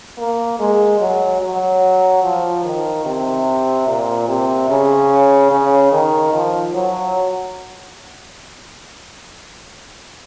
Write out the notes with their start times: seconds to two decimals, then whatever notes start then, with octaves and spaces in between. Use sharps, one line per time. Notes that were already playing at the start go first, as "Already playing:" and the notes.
0.18 A#3
0.60 G#3
1.01 F#3
1.41 F#3
2.23 F3
2.65 D#3
3.05 C3
3.87 A#2
4.28 C3
4.69 C#3
5.51 C#3
5.92 D#3
6.33 F3
6.74 F#3